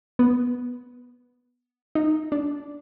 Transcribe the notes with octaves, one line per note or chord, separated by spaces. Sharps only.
B3
D#4
D4